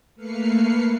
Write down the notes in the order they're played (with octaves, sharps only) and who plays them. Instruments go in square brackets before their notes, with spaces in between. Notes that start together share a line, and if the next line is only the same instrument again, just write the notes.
[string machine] A3 A#3 B4 F6 C7 C#7